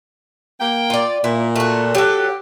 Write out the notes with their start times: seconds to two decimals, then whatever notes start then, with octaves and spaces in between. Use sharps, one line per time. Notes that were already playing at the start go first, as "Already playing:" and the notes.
0.60 A#3 G5
0.90 F4 D5
1.24 A#2 E4
1.56 A3 F#4
1.95 F#3 G4 A4